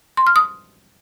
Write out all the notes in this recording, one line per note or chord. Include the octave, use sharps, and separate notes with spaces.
C6
F6
D#6